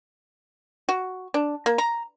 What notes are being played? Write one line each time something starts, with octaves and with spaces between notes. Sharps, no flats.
F#4
D4
A#3
A#5